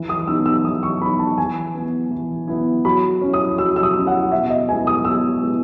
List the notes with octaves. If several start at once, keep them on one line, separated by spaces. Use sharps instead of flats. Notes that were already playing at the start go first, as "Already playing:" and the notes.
Already playing: E3
D#6
B3 D#4 E6
E6
E3 D#6
C#6
B3 D#4 B5
A5
E3 G#5
B3 E4
E3
B3 E4
F#3 B5
C#4 E4
D#6
F#3 E6
E6
D#6
C#4 E4
F#5
B2 E5
D#5
G#3 B3 E4 G#5
D#6
B2 E6
G#3 B3 E4